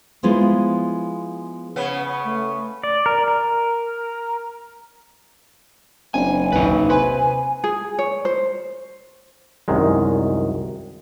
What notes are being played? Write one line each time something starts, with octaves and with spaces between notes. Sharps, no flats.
F3 G#3 B3 E4 F4
C#3 B3 C#5
F#5
F#5
A3
D5
A#4
A#4
F#1 C4 D4 G#5
A#1 D#2 D#4 B4
C3 B4 C5 G#5 B5
G#4
C#5
C5
C2 F#2 D#3 G#3